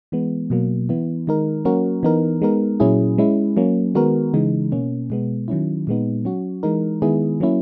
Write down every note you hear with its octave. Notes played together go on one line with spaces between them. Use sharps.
E3 G#3 B3
B2 F#3 A#3
E3 B3 E4
D#3 G#3 D#4 A#4
F#3 A#3 C#4 F#4 A#4
E3 B3 D#4 A#4
G#3 B3 D#4 A#4
A#2 F#3 C#4 E4 G#4
G#3 C#4 E4
F#3 A#3 C#4
D#3 G#3 B3 F#4 A#4
C#3 E3 G#3 D#4
B2 A#3 C#4
B2 G#3 B3
D#3 F#3 C#4 E4
A#2 G#3 B3 D#4
F#3 C#4 F#4
E3 G#3 D#4 A#4
D#3 G#3 B3 E4 G#4
F#3 A#3 C#4 E4